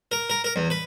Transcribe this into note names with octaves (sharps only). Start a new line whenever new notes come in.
A#4
A#4
A#4
E2
B4